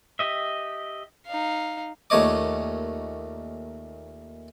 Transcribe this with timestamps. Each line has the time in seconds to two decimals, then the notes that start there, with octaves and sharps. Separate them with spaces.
0.19 G4 D#5 E5
1.27 D#4 F5
2.10 D#2 A#2 A3 C#5 D#5 D6